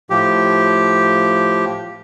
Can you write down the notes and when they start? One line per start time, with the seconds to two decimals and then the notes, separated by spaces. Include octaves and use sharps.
0.10 A2 F3 G4